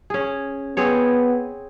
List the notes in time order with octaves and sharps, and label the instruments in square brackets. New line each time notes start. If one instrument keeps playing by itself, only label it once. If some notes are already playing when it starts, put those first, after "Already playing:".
[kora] C#4 G#4
[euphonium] B3 [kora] C4 G#4 C#5